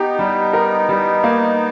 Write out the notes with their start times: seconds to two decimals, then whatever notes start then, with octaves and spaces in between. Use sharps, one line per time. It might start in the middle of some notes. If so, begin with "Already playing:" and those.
Already playing: B3 D#4 G4
0.19 G3
0.53 A#4
0.89 G3
1.24 A#3